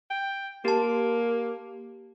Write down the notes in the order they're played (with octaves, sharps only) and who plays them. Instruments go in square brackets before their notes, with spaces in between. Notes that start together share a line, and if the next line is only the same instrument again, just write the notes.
[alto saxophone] G5
[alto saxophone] A#3 [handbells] G4 A5